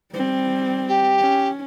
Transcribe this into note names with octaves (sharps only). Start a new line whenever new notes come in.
G3 C4
G4
C#4